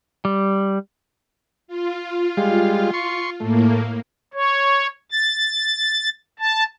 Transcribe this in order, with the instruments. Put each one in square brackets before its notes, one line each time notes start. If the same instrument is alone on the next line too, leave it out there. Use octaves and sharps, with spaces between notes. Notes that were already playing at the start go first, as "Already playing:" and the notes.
[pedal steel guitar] G3
[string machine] F4
[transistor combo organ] G3 G#3 F5
C6 C#6
[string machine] A2 A#3 [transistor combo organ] A3
[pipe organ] C#5
A6
A5